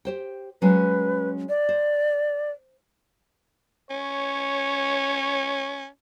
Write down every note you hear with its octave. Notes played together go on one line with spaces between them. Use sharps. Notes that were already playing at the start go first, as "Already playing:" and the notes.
G4 C5 G5
F#3 G#3 C#4 B4
D5
C5
C#4 C#5